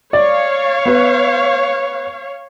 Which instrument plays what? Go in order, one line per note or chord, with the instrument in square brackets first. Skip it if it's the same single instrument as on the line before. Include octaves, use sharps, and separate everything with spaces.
[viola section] C#5 F5 [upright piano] D5
[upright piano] B3 B4